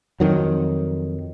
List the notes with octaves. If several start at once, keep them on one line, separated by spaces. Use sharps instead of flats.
F2 D#3 F#3